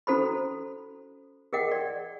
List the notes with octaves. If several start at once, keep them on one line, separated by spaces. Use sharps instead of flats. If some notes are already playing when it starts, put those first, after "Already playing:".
C#4 F#4 A4 C5 A#5 B5
G#4 A#4 D#5 F#5 G5
D5